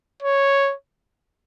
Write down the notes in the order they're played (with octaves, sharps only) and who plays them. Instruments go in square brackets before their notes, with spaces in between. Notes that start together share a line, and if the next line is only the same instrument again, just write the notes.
[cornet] C#5